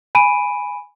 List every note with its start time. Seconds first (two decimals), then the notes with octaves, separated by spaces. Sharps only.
0.15 G#5 B5 D7 D#7